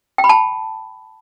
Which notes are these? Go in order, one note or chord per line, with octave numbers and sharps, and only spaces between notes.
G5
B5
A5